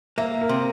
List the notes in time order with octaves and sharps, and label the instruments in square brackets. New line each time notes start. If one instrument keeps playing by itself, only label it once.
[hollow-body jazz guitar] A#3 [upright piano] E5
[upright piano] A#4
[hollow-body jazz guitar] C3